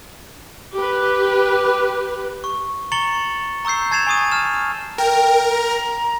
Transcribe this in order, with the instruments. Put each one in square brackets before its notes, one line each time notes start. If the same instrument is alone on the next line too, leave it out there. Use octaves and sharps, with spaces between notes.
[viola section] G4 B4
[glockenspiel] C#6
A#5 C#6 A6 C#7 F#7 G7
A#5 C#6 E6 G6 C7
A5 G#6 A6 C7 E7 F7
G#5 C#6 D#6 D#7
A5 F6 E7
[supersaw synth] A#4 [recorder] G5
[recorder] A#5